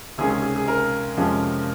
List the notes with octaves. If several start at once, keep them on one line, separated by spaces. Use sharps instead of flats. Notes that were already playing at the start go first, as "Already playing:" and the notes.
C#2 C3 D#3 G#3 C#4 G#4
G#4
G#4
G#4
A#4
F2 C3 F3 G#3 C#4